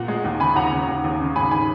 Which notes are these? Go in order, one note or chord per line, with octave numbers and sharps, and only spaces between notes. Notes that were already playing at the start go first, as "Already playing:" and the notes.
Already playing: A#2 F#5 A#5
G#3
D#2
C#3 G#5 B5
D#2 F#5 A#5
C#3
D#2
D#2
C#3
G#2 G#5 B5
D#3 G#5 B5